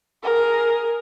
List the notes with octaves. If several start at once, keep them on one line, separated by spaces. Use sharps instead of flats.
G#4 A#4